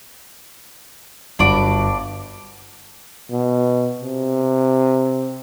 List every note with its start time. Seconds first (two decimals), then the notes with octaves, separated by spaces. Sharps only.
1.39 G1 D4 F#4 B5 D6
3.31 B2
4.00 C3